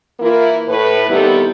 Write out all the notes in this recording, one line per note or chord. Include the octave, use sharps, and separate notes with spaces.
E3 A#3 E4 F4 A#4
A2 B4
C3 D#3 G3 B3 E4 A4